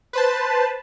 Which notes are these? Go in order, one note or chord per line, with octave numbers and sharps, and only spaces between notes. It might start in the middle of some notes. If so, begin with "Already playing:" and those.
B4 C5 A5